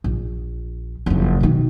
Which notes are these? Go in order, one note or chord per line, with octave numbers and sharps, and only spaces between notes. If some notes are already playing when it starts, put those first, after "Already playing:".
A#1
F#1 F2
B2 D#3